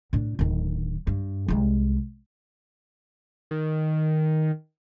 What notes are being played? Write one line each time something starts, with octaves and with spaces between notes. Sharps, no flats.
A2 D4
D1 D#3
G2
C2 G#3
D#3